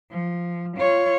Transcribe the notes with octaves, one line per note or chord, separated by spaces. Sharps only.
F3
F4 C#5